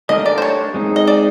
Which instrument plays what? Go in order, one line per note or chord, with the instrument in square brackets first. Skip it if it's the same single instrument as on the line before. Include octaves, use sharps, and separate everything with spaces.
[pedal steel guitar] A3 D4 G4 A#4 [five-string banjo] D#5
[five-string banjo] D5
C5
C#5
[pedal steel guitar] G#3 C4 D#4 G#4
[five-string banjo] D#5
D5